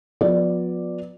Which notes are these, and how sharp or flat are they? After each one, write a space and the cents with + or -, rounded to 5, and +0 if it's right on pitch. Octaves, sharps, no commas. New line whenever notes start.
F3 +35 B3 +0 D5 +0